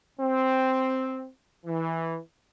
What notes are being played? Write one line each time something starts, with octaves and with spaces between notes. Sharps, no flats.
C4
E3